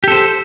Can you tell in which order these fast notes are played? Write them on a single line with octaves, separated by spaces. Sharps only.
G4 A4 C5